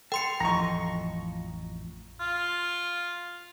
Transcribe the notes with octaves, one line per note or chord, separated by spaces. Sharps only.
A4 G5 C6 C#7
A1 F2 F3 D#5 A#5 C#6
F4